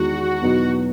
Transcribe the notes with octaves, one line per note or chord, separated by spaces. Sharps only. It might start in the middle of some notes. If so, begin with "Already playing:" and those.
Already playing: E2 D#3 G#3 F#4
E2 B2 F#3 B3 D#4